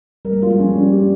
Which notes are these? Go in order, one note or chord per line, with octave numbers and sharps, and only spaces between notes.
G3 A#4
A#3
G#3 F4
G3
F3 C#4
G3
G4